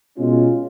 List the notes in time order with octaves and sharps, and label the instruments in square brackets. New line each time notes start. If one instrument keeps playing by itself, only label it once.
[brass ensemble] B2 G#3 C#4 F4